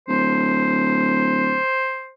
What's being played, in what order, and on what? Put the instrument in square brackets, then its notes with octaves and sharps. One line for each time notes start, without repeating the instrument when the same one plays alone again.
[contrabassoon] D1 [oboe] C5